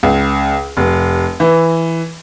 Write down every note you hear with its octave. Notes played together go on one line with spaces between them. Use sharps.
C#2
F1
E3